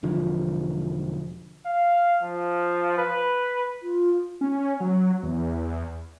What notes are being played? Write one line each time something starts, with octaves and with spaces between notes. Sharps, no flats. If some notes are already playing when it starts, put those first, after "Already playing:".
E1 D3 F3
F5
F3
B4
F4
C#4
F#3
E2